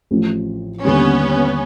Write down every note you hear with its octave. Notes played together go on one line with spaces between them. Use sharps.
A1 A2 F3
D#2 D3 G3 B3 C#4